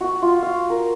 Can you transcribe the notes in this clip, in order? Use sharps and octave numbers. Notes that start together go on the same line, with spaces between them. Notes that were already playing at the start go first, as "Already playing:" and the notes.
F#4 F#5
F4
F#4 F5
A#4